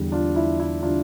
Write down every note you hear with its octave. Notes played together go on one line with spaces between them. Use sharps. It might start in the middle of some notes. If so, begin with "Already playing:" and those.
Already playing: E2 D3 G3
D4 F4
E4
E4
D3 G3 D4 F4